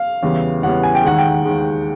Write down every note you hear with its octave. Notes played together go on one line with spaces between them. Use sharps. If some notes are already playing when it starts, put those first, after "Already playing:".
Already playing: F5
E2 C#3 E3 G3 B3
E2 C#3 E3 G3 B3 F#5
G#5
G5
D#2 D#3 G#3 F#5
G5
D#2 D#3 G#3